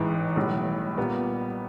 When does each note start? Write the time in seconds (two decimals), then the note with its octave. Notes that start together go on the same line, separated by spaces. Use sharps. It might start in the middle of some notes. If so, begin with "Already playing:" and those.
Already playing: A1 G#2 E3
0.36 B1 A2 E3 G3
0.98 A#2 G3 B3